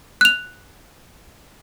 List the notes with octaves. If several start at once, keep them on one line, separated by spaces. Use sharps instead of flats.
F#6 F7